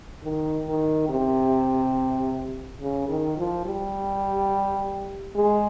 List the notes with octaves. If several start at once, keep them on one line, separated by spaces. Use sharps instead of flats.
D#3
D#3
C3
C#3
D#3
F3
G3
G#3